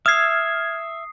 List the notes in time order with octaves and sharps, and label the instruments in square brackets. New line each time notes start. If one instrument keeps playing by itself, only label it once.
[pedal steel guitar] E5 [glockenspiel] D#6 C7 [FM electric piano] F6 G#6